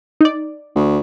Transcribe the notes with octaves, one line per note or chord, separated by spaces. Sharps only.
D#4 D5
D2